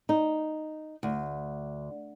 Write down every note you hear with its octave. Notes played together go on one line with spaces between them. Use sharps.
D#4
D2